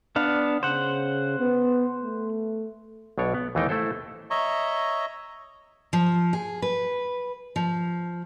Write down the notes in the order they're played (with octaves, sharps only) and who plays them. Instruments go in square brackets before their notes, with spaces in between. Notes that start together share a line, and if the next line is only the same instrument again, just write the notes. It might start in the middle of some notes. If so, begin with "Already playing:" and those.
[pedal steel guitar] B3 D4 F5
[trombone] C#3 [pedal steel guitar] C5 F#5
[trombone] B3
A3
[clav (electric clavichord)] B1 B2 D4 C#5
B3
D#2 E3 A3 D#4 G5
A3 E4 A4 C5
[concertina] C#5 D#5 E5 A#5 C#6
[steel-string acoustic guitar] F3
G#4
B4
F3